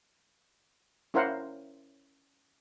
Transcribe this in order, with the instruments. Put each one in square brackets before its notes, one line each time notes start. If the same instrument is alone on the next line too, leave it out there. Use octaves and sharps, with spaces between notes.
[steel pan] C#4 E4 A#4 C5 F5 F#5